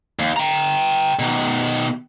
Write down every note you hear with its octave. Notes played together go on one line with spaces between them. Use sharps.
D#2
G5 A#5
B2 D#3